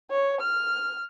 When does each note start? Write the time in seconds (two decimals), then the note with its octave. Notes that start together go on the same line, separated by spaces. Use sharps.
0.11 C#5
0.41 F6